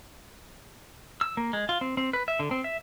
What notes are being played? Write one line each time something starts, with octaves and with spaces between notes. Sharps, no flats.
E6
A#3
G#3
F4
C4
C4
B4
E5
D3
C4
E5